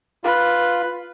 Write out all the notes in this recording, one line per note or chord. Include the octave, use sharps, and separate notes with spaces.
F4 B4